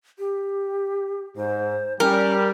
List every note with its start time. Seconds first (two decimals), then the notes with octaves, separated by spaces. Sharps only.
0.19 G4
1.37 G#2 C5
2.00 G3 C#4 A#4